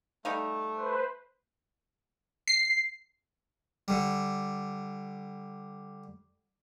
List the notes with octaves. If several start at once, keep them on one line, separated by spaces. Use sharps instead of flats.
G3 A3 D#4 F5
B4 C5
C7
D3 G3